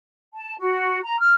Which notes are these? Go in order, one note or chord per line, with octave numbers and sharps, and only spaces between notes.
A5
F#4
A#5
F6